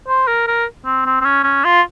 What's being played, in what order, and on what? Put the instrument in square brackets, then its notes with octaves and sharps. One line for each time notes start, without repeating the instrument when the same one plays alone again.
[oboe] C5
A#4
A#4
C4
C4
C4
C#4
C#4
F4